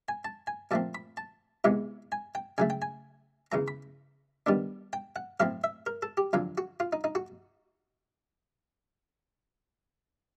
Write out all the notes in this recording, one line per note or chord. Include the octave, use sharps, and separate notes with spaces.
G#5
A5
G#5
A#2 F3 A3 C4 A5
B5
A5
E2 C3 E3 G#3 B3
G#5
G5
C#3 F#3 A3 G#5
G5
G#5
E2 C#3 E3 A#5
B5
D#3 G3 B3 D4
G5
F#5
A2 F#3 A3 C4 F5
E5
A#4
A4
G4
F2 D3 F#3 F4
F#4
F4
D#4
D#4
F#4